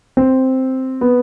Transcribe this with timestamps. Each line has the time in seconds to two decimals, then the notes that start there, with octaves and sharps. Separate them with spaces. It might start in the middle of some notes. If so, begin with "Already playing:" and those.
0.17 C4
1.01 B3